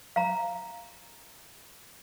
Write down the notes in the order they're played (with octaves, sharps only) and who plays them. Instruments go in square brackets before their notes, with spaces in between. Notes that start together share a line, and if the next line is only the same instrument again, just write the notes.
[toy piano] F5 A#5